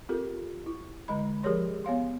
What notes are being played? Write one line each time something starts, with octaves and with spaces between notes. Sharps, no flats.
C4 F4 G4 A4 A#4
E4
D3 G#3 D#5 B5
F3 G4 G#4 A#4 C#5 C6
B3 C#5 F5 C6